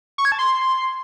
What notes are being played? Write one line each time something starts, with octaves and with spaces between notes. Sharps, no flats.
C#6
G#6
A5
C6